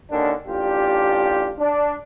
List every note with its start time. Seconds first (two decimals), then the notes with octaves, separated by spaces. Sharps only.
0.11 D#2 D3 D#3 C#4 D4
0.47 A1 D4 F4 G4
1.59 D4